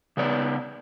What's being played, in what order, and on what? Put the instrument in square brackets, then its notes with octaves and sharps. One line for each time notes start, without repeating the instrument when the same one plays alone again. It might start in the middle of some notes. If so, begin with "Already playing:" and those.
[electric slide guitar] C#3 B3 D5